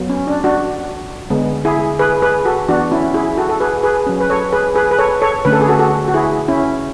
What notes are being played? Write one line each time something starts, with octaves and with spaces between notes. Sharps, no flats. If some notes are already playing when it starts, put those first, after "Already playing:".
Already playing: F#3 B3
C#4
D4
D4 F#4
D3 G#3 B3
E4 G#4
G#4 B4
G#4 B4
F#4 A4
E3 B3 D4 F#4
C#4 E4
E4 G#4
F#4 A4
A4
G#4 B4
G#4 B4
F#3 C#4
B4
A4 C#5
G#4 B4
G#4 B4
B4
A4 C#5
A4 C#5
D3 A3 C#4 B4
A4
G#4
F#4 A4
F#4 A4
F#4
E4 G#4
C#4 E4